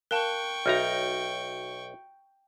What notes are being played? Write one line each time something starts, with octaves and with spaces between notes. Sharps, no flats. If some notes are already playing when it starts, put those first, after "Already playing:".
A#4 F5 G5 A5 C#6 F#6
B1 D#4 F#4 E5 A#5 F6